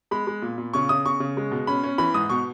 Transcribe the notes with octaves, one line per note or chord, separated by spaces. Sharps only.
G#3 B5
G#3
A#2
A#2
C#3 C#6
C#3 D#6
C#3 C#6
C#3
G#3
B2
C#4 B5
C#4
E3 B5
G#2 D#6
B2 C#6